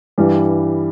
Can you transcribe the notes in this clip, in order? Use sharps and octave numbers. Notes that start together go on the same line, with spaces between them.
G2 E3 G3